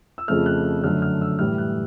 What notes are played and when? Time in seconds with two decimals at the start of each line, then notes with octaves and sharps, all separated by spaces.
0.18 E6
0.28 F2 C#3 F3 A3 F6
0.46 F#6
0.84 F#2 D3 F#3 A3 F6
1.02 F6
1.21 E6
1.39 A2 E3 G3 F6
1.58 F#6